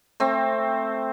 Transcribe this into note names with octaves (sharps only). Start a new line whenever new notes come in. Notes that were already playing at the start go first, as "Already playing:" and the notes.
A3 C4